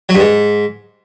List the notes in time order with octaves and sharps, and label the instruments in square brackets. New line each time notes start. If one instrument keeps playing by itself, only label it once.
[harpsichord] F#3
G2
G#2